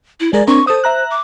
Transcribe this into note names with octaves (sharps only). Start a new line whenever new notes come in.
E4
G#3 G#4 A#4 D5
C4 D4 A#4 C#6
A4 C5 D#6
E5 A#5 F#6
D6